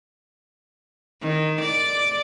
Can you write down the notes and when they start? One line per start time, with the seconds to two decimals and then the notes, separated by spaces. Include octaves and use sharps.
1.21 D#3
1.61 D5